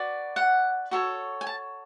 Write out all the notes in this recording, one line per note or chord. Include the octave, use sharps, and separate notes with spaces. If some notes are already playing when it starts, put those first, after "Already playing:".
Already playing: F#4 B4 D5
F#5
F#4 A4 C#5
G#5
A5